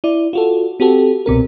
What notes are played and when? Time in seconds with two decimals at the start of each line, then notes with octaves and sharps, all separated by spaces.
0.04 E4 D5
0.33 F4 F#4 A4
0.80 C4 F#4 G4 A4
1.26 C2 B2 C4 A#4